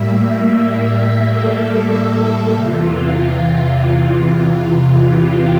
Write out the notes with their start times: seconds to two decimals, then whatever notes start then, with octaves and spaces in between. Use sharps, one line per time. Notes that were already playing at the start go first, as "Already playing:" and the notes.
Already playing: A2 G3 A#3 E5
0.81 E5
1.23 A4
2.50 E2 C3 E3 F4
2.92 F4
3.35 F4
5.04 G4